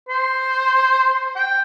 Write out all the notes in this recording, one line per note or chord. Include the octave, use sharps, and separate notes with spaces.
C5
G5